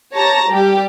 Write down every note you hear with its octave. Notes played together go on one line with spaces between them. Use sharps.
G4 C#5 A5 A#5 A#6
G3 G4